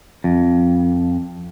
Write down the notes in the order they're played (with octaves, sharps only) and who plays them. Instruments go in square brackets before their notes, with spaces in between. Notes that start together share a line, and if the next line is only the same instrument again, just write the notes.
[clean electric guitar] F2